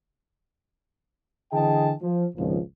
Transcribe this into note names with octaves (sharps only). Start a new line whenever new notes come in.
D3 E3 G#4 D#5 G5 A5
F3
G#1 C#2 A#2 F3